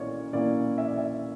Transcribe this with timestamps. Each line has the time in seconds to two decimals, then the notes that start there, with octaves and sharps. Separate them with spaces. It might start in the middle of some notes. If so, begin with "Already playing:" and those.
Already playing: B1 A#2 A#3 C#4 E4 C#5 D5
0.33 B1 A#2 A#3 C#4 E4 D5
0.78 E5
0.88 D5
0.98 E5